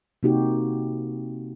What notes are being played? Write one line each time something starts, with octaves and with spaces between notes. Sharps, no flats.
C3 A#3 D#4 F#4 G4